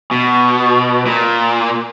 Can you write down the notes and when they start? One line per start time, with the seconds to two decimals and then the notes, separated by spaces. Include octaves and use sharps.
0.11 B2
1.06 A#2